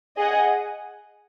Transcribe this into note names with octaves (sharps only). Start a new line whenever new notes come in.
G#4 D#5 F#5